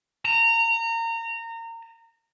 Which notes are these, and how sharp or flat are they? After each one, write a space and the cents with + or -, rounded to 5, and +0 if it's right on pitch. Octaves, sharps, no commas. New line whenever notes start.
A#5 -25